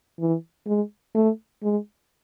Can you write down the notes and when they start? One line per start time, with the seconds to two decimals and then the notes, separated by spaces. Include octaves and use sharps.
0.20 E3
0.67 G#3
1.15 A3
1.63 G#3